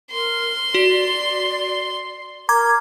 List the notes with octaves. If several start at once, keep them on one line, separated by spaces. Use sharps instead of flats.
A#4 C6
F#4 D5
A#4 A#5 D6 G#6